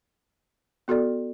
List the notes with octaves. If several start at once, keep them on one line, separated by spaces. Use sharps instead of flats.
B3 F#4 A4 D5